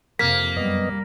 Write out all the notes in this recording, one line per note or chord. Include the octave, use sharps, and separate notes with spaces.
F2 C3 A#3 B6
F#2 G3 B3 D#5